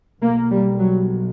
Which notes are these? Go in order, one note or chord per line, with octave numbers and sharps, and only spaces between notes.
B1 B2 A#3
G3
F#3